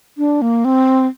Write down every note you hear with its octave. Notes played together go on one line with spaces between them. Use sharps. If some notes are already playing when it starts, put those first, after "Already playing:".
D4
A#3
C4